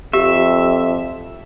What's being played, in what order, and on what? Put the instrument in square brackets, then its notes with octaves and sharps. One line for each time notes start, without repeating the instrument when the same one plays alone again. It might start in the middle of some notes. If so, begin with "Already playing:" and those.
[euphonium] F2 [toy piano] G4 [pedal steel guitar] E5